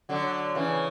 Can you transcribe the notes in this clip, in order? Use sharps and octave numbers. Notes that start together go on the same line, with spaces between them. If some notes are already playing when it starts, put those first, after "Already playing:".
D3 F#3
C#3 E3